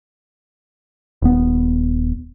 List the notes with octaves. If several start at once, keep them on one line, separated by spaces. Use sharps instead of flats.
D#1 B3